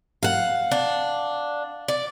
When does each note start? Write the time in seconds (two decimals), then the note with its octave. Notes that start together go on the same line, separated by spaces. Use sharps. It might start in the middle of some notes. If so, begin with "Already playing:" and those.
0.23 F5 F#5
0.71 D4
1.88 D5